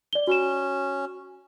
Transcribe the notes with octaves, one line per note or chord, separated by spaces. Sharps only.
D5 G7
C#4 F#4 E7